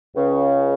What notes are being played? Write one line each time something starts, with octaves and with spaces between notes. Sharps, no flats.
C#2 C#3